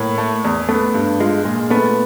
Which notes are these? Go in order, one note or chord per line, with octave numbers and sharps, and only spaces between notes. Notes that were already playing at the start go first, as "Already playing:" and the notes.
Already playing: A2 A#3
A3
E2
A3 B3
G2
G#3 F4
A#2 G#3
A3 B3